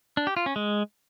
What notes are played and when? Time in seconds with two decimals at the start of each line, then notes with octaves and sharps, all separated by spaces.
0.17 D4
0.27 G4
0.37 F4
0.46 C#4
0.56 G#3